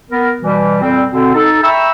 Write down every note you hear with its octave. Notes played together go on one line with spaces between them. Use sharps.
B3 A#4
B2 E3 G3
F2 A#2 G3 C4
B2 D3 C4
D#4 A4
E5 G5 A#5 B5 C#6 E6